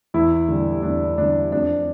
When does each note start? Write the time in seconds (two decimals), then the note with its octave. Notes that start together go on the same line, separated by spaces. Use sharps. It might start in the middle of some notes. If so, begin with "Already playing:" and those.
0.14 E2 E4
0.49 D3 G3
0.83 E2 D4
1.18 D3 G3 D4
1.52 F2 D4